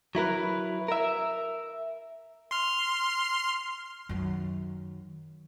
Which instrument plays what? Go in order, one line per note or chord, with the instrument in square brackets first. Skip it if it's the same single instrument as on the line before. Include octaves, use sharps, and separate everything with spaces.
[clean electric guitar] F#3 E4 A#4 B4
A#4 E5
[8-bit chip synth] C6 F6
[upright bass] F#2 D#3